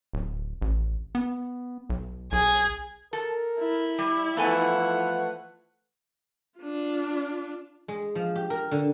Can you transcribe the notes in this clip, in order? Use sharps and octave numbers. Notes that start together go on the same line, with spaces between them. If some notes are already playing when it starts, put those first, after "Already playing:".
D1
A1
B3
B1
B1 G#4 G#6
A4 A#4
E4
G3
E3 F3 A3 B3 A4 F#5 G#5
D4 F4
G#3
F3
G4
A#4
D3